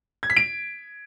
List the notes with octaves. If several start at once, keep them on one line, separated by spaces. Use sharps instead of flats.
G#6
B6
D7